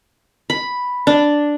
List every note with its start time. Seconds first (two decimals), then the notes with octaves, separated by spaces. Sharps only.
0.50 B5
1.07 D4